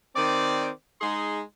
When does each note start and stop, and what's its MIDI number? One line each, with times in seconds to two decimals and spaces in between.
0.16 0.70 51
0.16 0.70 60
0.16 0.70 74
1.01 1.42 56
1.01 1.42 63
1.01 1.42 68
1.01 1.42 84